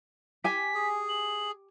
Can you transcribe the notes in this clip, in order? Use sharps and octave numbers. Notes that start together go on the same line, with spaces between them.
G4 G#5 B6
G#4
F#7